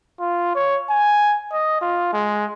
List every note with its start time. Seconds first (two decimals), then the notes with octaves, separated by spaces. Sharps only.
0.20 F4
0.55 C#5
0.89 G#5
1.52 D#5
1.81 F4
2.13 G#3